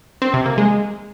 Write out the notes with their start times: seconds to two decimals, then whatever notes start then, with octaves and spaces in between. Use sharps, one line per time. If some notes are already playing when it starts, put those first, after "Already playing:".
0.22 C4
0.34 C3
0.46 A#3
0.58 G#3